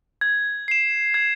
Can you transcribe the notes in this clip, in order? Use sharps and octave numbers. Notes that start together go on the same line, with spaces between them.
G#6
C7 E7
G#6